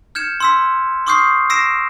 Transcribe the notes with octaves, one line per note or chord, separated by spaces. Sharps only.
F6 G6 G#6 C#7 E7
C6 E6 B6
C6 C#6 D#6 F6 G6 C7
E6 A#6 C7 D7 E7